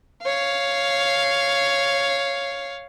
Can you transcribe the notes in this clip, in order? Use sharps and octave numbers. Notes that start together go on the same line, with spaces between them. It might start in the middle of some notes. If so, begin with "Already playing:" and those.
C#5 F5